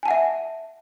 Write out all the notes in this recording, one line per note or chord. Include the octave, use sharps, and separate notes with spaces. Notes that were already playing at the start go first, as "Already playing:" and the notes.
E5 F#5 G#5 A5